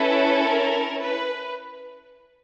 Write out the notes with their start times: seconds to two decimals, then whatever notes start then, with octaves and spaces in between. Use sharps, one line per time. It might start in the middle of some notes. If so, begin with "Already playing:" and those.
Already playing: C#4 E4 A4 B4
0.45 A#4
0.99 B4